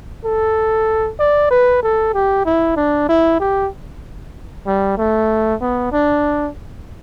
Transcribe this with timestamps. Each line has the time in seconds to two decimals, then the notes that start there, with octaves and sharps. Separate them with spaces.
0.25 A4
1.19 D5
1.51 B4
1.83 A4
2.14 G4
2.45 E4
2.77 D4
3.09 E4
3.40 G4
4.67 G3
4.98 A3
5.60 B3
5.92 D4